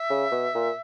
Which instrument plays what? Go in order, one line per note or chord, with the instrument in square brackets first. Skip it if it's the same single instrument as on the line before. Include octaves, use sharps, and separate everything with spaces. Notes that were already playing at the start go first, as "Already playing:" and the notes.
Already playing: [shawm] E5
[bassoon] C#3
B2
A#2